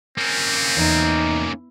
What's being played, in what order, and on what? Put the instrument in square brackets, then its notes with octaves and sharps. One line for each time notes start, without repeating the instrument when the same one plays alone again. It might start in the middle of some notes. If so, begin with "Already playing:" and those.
[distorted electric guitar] A#3 C#4 [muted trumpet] C4
[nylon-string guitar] E2 [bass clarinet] D#4